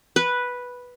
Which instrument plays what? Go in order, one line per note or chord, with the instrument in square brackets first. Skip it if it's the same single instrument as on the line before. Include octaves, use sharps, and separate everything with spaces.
[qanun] B4